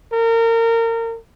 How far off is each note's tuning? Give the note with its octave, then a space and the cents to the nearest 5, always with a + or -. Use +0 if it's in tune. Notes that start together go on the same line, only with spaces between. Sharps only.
A#4 -30